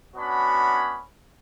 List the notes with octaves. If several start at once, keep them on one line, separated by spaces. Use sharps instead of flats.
B3 C#4 D4 F#4 C#5 B5